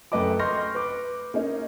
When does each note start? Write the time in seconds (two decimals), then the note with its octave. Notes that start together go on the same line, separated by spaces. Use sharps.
0.12 F#2 A3 B4 D#5 G5 D6
0.39 C6 C#6 F6 G6 A#6
0.75 B4 D6
1.34 A#3 C#4 D#4